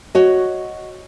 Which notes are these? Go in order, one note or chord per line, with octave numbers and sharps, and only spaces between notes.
F#4 C#5 D#5